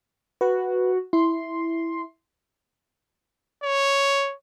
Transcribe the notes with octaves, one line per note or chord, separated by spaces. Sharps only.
F#4 B4
E4 C6
C#5